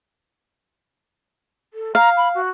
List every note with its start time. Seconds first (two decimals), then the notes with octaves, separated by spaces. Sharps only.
1.73 A4
1.95 F5 A#5
2.17 B5
2.35 F#4